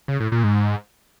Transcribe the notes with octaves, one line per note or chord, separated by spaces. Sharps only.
C#3
A2
A#2
G#2